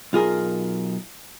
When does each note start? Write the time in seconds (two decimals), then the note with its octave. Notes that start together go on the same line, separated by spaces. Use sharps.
0.13 B1 F4 G#4 A#4